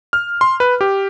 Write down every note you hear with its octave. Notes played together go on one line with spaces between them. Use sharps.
F6
C6
B4
G4